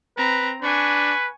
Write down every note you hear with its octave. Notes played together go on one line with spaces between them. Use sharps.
C4 B4 A#5
D4 B4 G#5 C#6